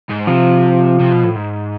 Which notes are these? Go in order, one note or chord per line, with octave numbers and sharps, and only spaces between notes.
G#2
C3 F3
C3
B2
A2
G#2